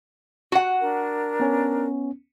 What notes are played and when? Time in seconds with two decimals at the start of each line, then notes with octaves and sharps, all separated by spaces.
0.52 F#4 F#5
0.80 D4 A#4
1.40 B3 C#4